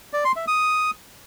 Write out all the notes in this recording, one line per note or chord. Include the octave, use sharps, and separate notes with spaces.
D5
C6
E5
D#6